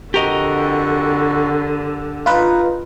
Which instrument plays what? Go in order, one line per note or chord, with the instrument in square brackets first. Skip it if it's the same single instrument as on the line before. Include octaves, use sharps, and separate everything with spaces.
[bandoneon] F2 F#4 [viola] D3 [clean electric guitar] G4 A#4 D#5
[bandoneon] D#4 [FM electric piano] F4 B4